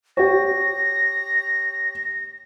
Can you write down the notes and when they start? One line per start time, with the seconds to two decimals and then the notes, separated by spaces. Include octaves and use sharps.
0.17 G4 C#5 A#6